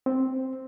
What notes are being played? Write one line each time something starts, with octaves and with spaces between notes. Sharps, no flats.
C4